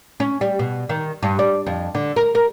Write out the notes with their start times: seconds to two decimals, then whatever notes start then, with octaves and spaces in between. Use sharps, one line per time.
0.20 C#4
0.41 G3
0.59 B2
0.89 D#3
1.23 G2
1.39 D5
1.66 F2
1.95 D3
2.16 A#4
2.35 A#4